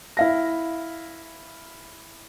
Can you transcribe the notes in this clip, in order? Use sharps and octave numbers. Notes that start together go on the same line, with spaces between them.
E4 F5 A#6